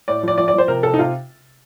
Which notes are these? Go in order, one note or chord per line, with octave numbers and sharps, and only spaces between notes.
A2 D5
F3 D5
F3 D5
D5
F3 C5
C3 A#4
C3 A4
D#4
C3 F4